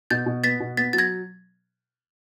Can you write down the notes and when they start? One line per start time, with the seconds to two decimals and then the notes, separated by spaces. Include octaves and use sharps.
0.10 B2 G6 A6
0.26 B2
0.44 B3 A6 B6
0.60 B2
0.77 B3 A6 B6
0.93 F#3 A6
0.98 G#6 A#6